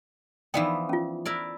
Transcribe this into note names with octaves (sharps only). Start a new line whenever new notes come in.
E3 F3 B3 D#4 D5 G5
C#4 F4
E4 A#4 D5